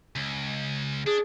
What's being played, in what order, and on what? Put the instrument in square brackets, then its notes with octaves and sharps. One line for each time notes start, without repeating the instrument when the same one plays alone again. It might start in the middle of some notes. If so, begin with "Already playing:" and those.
[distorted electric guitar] C#2
[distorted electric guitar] D4 [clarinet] G#4